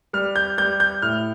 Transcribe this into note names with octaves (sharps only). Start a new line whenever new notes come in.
G3 F6
G6
G3 G6
G6
A2 F6